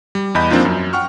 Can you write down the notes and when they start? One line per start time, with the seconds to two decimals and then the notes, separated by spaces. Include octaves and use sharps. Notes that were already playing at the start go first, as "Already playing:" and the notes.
0.15 G3
0.35 E2 G3 D#5 B5 G6
0.51 F3 A#3 C4 D4 D#4 F4
0.65 F#2
0.93 F#5 G5 C#6 F6